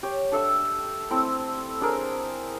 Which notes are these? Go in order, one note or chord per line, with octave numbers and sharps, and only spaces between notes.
G4 C#5
D4 A4 E5 E6
A3 C4 E4
D4 G#4 A#4 C5